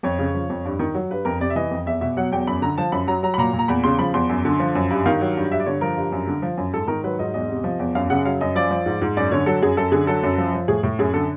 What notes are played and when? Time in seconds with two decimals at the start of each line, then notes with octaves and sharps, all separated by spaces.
0.03 F2 C#5
0.19 C#3
0.34 F3
0.49 F2
0.65 G2
0.79 D#3
0.94 F#3
1.11 G2 B4
1.25 F2 A#4
1.40 C3 D5
1.50 E5
1.56 E3 D#5
1.71 F2
1.86 E2 E5
2.01 B2 E5
2.17 F#3 F#5
2.32 E2 G5
2.47 F#2 B5
2.62 D3 A#5
2.78 F3 A5
2.92 F#2 B5
3.07 F#3 A#5
3.23 F#3 A#5
3.34 B5
3.38 A#2 A#5
3.53 A#2
3.59 A#5
3.68 E2 B5
3.84 C#3 C6
3.99 F3 B5
4.14 E2 C6
4.29 F#2
4.45 D3
4.60 F3
4.75 F#2
4.91 G2 B5
5.06 D#3 F5
5.21 F#3
5.37 G2
5.51 G2 E5
5.60 D5
5.66 D3 C#5
5.81 F3 A#4
5.97 G2
6.12 F#2
6.27 D3
6.42 F3
6.57 F#2
6.74 G#2 A4
6.88 D#3 A#4
7.04 F#3 B4
7.19 G#2 D#5
7.34 E2 D#5
7.49 C3
7.64 F3
7.79 E2
7.95 F#2 F5
8.10 C#3 F#5
8.25 F#3 F5
8.41 F#2 D#5
8.56 F3 D5
8.71 F3
8.86 G#2
9.02 G#2
9.17 F#2 D5
9.31 D3 C#5
9.46 F#3 A4
9.62 F#2 G#4
9.77 F#2 A4
9.92 D3 G#4
10.07 F#3 A4
10.23 F#2
10.38 F3
10.53 F3
10.68 A2 G#4
10.83 A2
10.99 F#2 G#4
11.14 D3 A4